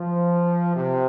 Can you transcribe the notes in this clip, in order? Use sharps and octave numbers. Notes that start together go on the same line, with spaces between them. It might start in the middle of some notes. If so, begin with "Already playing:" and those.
Already playing: F3
C3